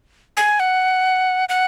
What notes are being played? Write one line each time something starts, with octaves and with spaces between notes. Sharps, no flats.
G#5
F#5
F#5